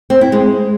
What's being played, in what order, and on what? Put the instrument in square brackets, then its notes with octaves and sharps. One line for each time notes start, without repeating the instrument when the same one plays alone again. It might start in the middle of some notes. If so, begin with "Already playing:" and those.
[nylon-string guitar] C4
E4
G#3